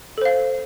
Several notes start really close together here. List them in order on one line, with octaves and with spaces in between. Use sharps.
A4 C5 F5